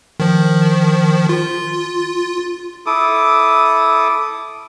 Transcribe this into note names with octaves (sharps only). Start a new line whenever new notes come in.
D#3 F3
F4
E4 A4 D6 D#6